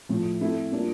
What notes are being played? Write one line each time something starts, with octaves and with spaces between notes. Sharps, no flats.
A2 F3 A3
A3 C4 E4 A4
G3 A#3 D4 F4